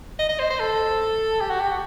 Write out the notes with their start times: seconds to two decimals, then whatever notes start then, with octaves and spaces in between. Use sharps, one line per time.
0.19 D#5
0.29 D#5
0.39 C5
0.50 C5
0.59 A4
1.41 G4
1.50 F#4
1.61 G4
1.71 F#4